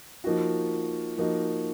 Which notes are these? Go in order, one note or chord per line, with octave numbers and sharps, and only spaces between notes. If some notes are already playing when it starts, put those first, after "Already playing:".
F3 A#3 D#4 F#4
F3 A#3 D#4 F#4